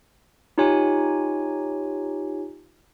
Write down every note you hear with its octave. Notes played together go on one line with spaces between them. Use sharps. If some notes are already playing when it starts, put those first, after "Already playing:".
D#4 F4 G4 C#5 G#5